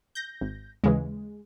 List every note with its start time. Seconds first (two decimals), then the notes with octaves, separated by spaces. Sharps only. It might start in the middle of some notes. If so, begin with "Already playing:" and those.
0.15 G6 A#6
0.41 G#1
0.84 D#2 C#3 E3 G#3